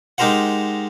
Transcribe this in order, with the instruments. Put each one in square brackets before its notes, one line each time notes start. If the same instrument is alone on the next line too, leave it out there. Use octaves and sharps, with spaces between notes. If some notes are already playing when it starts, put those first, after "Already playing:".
[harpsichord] G#3 D#4 G4 A#4 C5 F#5